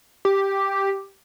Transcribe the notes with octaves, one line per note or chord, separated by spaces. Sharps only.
G4